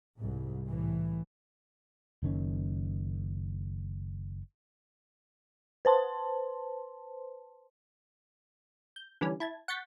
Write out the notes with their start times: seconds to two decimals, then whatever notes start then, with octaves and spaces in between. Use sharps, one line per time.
0.18 C2 G#2
0.68 C2 A2 E3
2.23 F#1 D#3 C#4
5.85 B4 C5 A5 C6
8.96 G6
9.21 D3 E3 G3 C#4
9.40 E4 A5 G#6
9.68 F#5 C#6 G6 A6 B6